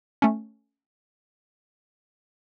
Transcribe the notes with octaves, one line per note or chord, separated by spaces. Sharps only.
A3 C#4